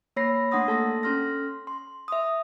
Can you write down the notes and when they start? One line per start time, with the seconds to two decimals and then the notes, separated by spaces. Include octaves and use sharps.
0.16 A#3 C#5 B5 A#6 C7
0.51 A3 D4 F#5 C6 D#6 A#6
0.67 A#3 A4 A5 C6 A#6
1.03 C#4 A4 C6 F6 A#6
1.67 C6
2.08 E5 D#6